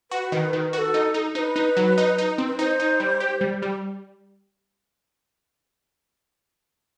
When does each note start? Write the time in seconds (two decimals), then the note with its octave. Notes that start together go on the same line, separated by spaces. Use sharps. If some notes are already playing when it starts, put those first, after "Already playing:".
0.11 F#4 B4
0.32 D#3
0.53 D#3
0.73 F#4 B4
0.78 A4
0.94 D#4
1.14 D#4
1.35 D#4 C5
1.39 B4
1.56 D#4
1.77 F#3
1.98 D#4
2.18 D#4
2.38 C4
2.48 B4
2.59 D#4 C5
2.80 D#4
3.00 G3
3.20 G4
3.41 G3
3.62 G3